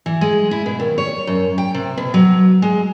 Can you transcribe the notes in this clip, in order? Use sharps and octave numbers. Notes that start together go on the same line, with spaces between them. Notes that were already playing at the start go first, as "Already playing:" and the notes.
E3
G#3
E4
B2
D#2
C#5
F#2
G5
C3
B2
F#3
G#3